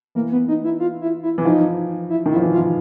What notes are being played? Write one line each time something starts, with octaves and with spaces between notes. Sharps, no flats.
E3 A#3
B3
D#4
E4
F4
E4
E4
E3
F3 D#4
E4
D#3 E4
F3
E3
F4
F3